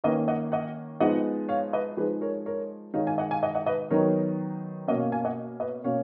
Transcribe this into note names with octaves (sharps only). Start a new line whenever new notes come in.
D#3 A#3 C#4 B4 D#5
D#5 F#5
D#5 F#5
F3 G#3 B3 D#4 D#5 F#5
C#5 F5
B4 D#5
F3 G#3 D#4 G#4 B4
A#4 C#5
A#4 C#5
D#3 G#3 D#4 C#5 F5
F5 G#5
D#5 F#5
F5 G#5
D#5 F#5
D#5 F#5
B4 D#5
D#3 F#3 B3 D#4 A#4 C#5
B2 A#3 C#4 D#5 F#5
C#5 F5
F5 G#5
D#5 F#5
B4 D#5
B2 A#3 C#4 C#5 F5